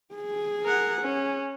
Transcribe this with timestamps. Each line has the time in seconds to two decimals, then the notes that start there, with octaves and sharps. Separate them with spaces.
0.15 G#4
0.64 A#4 F#5
1.01 C#4